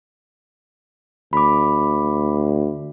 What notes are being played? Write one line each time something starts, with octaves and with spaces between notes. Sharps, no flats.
D2 B5 D6